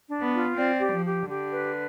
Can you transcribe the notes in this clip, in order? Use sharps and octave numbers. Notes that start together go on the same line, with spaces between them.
D4
B3
F4
C4 D5
G4
F3
G4
D3 G4
B4